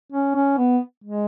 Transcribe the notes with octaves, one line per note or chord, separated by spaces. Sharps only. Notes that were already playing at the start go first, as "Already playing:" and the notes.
C#4
C#4
B3
G#3